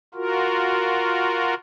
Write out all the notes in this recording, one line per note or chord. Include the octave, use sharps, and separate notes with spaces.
F4 F#4 A#4